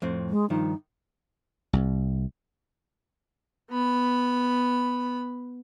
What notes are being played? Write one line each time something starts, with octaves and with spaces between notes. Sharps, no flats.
F2 A2 C4
G#3
G2 D#3 F3 D#4
C2
B3 B5